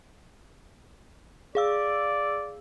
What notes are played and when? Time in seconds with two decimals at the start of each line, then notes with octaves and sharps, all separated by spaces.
1.55 G#4 D5 F5 E6